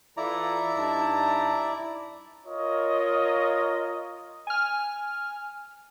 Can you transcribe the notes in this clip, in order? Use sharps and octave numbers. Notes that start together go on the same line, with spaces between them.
E3 E4 F4 A4 D5 A#5
G2 D#4 A5
F4 A#4 C#5 D#5
G#5 F6